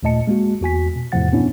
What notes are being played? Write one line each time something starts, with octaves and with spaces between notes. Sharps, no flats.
D#2 A#2 A3 D#5 A5 C#7
G#3 A#3 F#4
E2 F#4 G#5 B6
B2
E2 A2 C3 F3 F#5 A6
G2 B2 B3 C#4 D4 E4